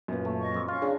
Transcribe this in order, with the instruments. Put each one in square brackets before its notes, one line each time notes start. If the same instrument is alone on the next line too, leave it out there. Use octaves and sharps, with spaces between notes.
[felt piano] F#2 A#2 B4
[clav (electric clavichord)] A3
[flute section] D#5 C#6
[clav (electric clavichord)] F2
[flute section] C#4 F5 C#6 [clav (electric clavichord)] F4
[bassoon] C#3 [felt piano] D4